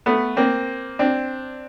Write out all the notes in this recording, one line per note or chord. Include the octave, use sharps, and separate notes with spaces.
A3 B3
A#3 C4
C4 D4